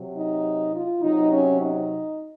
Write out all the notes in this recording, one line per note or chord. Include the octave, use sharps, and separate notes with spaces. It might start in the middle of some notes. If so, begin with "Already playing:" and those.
Already playing: C3 F#3
D#4
F4
C3 F#3 D#4
C#4
D#4